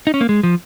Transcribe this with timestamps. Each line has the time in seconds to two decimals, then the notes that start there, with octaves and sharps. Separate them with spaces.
0.07 D#4
0.14 C#4
0.21 A#3
0.29 G#3
0.43 F3